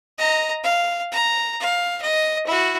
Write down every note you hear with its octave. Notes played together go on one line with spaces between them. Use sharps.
D#5 A#5
F5
A#5
F5
D#5
E4 F#4